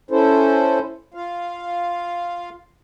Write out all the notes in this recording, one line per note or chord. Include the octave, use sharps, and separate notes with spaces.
C#4 E4 A4 C5
F4 F5